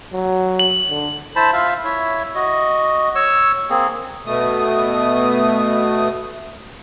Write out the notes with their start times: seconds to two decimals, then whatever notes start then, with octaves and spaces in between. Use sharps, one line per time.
0.13 F#3
0.59 F#7
0.89 D3
1.36 E4 C5 A5 B5
1.53 F4 E5 F5
1.84 E4 C#5 E5
2.35 F#4 D#5
3.15 C#5 C#6 E6
3.70 A#3 C4 G#4
4.26 B2 A3 D#6